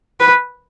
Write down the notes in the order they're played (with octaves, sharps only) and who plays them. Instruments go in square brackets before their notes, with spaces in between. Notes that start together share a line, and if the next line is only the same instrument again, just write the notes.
[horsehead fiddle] B4